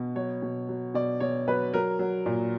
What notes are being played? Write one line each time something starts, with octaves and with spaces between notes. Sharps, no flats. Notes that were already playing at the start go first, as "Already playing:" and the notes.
Already playing: B2
F#3 C#5
B2
F#3
B2 D5
B2 C#5
F#3 B4
F#3 A#4
F#3
A#2